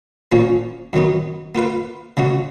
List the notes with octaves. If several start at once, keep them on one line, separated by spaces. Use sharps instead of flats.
A#2 F3 A#3 C#4
F#2 D#3 F#3 B3 D#4
A#3 F4 B4 F5
C#3 G#3 C#4 F#4